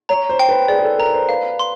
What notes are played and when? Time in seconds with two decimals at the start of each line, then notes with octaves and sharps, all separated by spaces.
0.09 C#5 A#5
0.29 C5
0.39 G5
0.49 B4
0.68 G#4 D5
0.79 G#4
0.84 A4
0.98 A#4 A#5
1.13 C5
1.29 B4 F5
1.59 C6